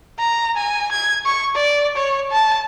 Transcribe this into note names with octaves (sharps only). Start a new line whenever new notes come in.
A#5
G#5
G#6
C#6
D5
C#5
A5